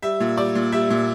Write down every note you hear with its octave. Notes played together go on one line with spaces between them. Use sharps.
G3 E5
A#2
G3 D5
A#2
G3 E5
A#2